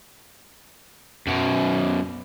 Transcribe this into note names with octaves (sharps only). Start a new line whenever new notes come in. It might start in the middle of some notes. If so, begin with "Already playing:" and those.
F#2 B2